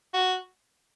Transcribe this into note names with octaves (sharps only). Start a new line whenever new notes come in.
F#4